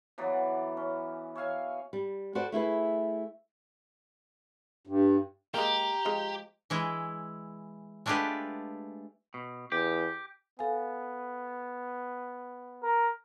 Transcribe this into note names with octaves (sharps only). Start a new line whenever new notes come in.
E3 F#3 B3 D5
C#4
C#5 E5 F5 G#5
G3
F#4 A4 B4 C5 D5 G5
A3 E4 G#4 B4
G2
G#3 A#3 G4 A#5
F3 G#3
E3 G#3 E4
G#3 A3 D4 F4 G4 B4
B2
E2 G4
B3 A4 F5 G#5
A#4